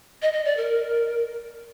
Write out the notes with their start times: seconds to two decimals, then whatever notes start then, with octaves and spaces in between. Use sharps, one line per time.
0.22 D#5
0.33 D#5
0.45 D5
0.57 A#4